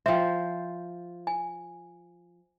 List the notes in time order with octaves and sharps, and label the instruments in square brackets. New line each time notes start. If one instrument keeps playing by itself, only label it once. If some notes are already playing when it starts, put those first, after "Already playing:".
[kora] F3 C5 [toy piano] E5 G5
[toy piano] G#5